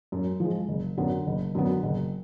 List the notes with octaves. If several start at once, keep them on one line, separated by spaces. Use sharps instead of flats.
F#2
F3 G#3
F#1
F#2 D3 F#3 B3
F#1
F#2 D3 F#3 B3
F#1